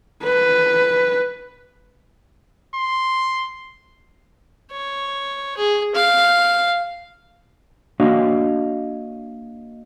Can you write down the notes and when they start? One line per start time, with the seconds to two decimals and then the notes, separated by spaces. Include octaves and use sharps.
0.23 B4
2.75 C6
4.71 C#5
5.57 G#4
5.94 F5
8.00 A#3 D4 F#4 C#5 D#5 F5